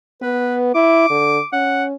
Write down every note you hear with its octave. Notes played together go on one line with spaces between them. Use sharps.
B3 B4
E4 D6
D3
C#4 F#5